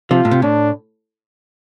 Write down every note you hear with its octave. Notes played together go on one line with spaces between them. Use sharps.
C3 F3 F4
A2
C3
A2 D4